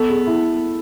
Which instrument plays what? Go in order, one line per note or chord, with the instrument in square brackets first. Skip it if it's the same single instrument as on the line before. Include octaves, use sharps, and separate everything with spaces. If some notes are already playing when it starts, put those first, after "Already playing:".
Already playing: [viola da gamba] B3 [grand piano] A4
[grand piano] G#4
E4